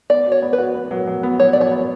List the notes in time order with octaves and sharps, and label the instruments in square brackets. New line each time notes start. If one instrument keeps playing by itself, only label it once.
[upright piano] B3 [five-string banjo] D5
[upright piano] F#4
[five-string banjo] C#5
[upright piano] B3
[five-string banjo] B4
[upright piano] F#4
B3
F#3
F#3
B3
[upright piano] F#3 [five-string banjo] C#5
[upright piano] F#3 [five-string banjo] D5
[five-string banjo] C#5
[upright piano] B3